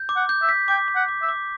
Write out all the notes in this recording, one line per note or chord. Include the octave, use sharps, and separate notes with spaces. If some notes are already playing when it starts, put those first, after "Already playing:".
Already playing: G6
D6
F#5
G6
E5
B6
G5 D6
D6
F#5
D6
E5
D6